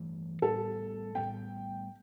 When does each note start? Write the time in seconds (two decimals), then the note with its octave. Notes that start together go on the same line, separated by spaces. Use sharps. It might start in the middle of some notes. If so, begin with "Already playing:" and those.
Already playing: G2 E3 A3
0.42 A2 G3 B3 A4
1.15 A2 G3 B3 G5